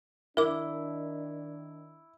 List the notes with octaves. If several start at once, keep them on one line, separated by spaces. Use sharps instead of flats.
D#3 D4 E4 A#4 D6